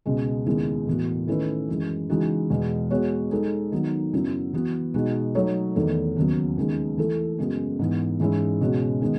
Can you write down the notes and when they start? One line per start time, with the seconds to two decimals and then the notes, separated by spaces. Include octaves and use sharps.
0.06 C#2 B2 G#3
0.46 D#2 C#3 G#3 B3 E4
0.87 A2 E3 B3 F#4
1.27 D#3 A3 C#4 E4 B4
1.68 F#2 E3 G#3
2.09 C#3 E3 G#3 D#4 F#4
2.50 E2 B2 G#3
2.91 G#3 B3 F#4 C#5
3.31 G#3 D#4 A4
3.72 D#3 F#3 B3 D#4
4.13 F#2 C#3 F#3 B3 E4
4.53 E3 B3 F#4
4.94 B2 G#3 D#4 F#4
5.35 F#3 A3 D#4 A4 C#5
5.76 E2 D#3 A3
6.16 D#2 C#3 F#3 B3
6.57 D#2 C#3 G#3 B3 D#4
6.98 E3 A3 E4 A4
7.38 F#2 C#3 G#3 B3 F#4
7.79 G#2 E3 B3
8.20 G#2 E3 G#3 C#4 E4
8.61 C#2 B2 G#3 C#4 F#4
9.02 D#3 G#3 B3